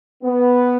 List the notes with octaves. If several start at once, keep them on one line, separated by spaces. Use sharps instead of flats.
B3